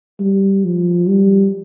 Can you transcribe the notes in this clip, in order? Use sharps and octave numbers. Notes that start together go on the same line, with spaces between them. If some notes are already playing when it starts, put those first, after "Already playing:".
G3
F3
G3